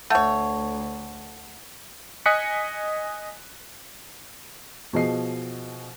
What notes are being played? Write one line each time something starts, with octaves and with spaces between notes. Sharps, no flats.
D2 A3 C#5 F#5 A5
D#5 G#5 D#6 F#6 B6 C#7
B2 F3 G#4 D#5 C7